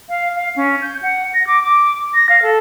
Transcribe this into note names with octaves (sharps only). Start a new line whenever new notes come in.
F5
F5
C#4
G6
F#5
A#6
D6
D6
A#6
F5
A4